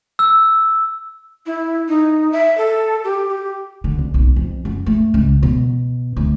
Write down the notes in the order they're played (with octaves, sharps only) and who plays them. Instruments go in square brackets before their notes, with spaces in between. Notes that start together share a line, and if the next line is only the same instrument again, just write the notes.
[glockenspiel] E6
[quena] E4
D#4
E5
A4
G4
G4
[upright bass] D3
C2
B1
F2
F#2
A3
C#2
B2
D2